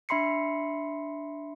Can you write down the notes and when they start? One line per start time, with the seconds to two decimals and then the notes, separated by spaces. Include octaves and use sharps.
0.09 D4 E5 B5 C6 C7 C#7